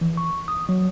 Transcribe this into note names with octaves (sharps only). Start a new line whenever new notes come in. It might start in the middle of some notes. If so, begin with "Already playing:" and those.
E3
C#6
D#6
F#3